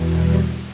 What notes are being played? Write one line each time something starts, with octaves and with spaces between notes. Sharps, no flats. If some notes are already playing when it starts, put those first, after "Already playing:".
Already playing: E2 B2
G3